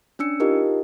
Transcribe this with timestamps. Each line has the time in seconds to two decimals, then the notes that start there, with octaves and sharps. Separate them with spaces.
0.19 C#4 D4 E6 C#7
0.40 D#4 F4 G4 A#4 D#5